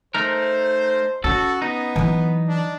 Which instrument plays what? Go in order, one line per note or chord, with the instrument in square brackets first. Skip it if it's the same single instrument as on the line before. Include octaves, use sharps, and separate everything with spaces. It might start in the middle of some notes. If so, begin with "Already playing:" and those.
[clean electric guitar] A3 D#4 A#4 [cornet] C5
[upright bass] C#4 [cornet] F#4 [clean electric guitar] A4
[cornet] B3 [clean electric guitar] D#4
[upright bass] E3 F#3
[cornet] D4